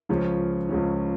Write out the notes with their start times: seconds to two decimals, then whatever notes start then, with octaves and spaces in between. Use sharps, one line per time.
0.09 C#2 C#3 F3 C#4
0.69 C#2 C#3 F3 C#4